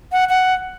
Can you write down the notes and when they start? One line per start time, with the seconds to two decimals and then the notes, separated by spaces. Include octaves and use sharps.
0.12 F#5
0.29 F#5